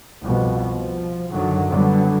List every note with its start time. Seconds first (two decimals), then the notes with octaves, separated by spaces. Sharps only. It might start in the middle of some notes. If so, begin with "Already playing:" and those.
0.23 C2 F2 B2
0.76 F3
1.30 F#2 D3 D#3 F#3
1.70 D3 F#3 G3 B3